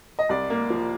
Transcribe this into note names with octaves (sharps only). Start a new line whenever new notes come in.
D#5
C2 D5
A#3
F3